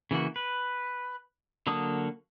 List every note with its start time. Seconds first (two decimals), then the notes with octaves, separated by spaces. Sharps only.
0.11 C#3 E3 A#3 F#4
0.36 B4
1.67 D3 F#3 A#3 A5 D#6